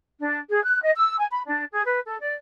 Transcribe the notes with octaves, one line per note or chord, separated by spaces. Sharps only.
D4
G#4
F#6
D#5
E6
G#5
B5
D4
G#4
B4
A4
D5